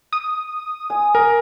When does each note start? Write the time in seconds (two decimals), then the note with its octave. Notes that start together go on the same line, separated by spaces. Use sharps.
0.13 D#6
0.90 G#5
1.15 A#4